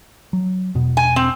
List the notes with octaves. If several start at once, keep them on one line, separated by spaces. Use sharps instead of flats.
F#3
E1 B2
G#5
C4